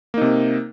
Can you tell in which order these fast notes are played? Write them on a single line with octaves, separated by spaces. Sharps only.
A#3 D#4 C3